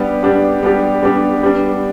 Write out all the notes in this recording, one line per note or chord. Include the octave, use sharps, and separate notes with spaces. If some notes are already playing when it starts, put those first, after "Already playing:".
Already playing: G3 B3 D4 G4
G3 B3 D4 G4
G3 B3 D4 G4
G3 B3 D4 G4
G3 B3 D4